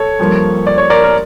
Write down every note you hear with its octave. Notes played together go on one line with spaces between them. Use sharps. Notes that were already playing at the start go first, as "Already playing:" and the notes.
Already playing: A4 C#5
G2 F3 A#3
D5
C#5
A#4 D5
A#4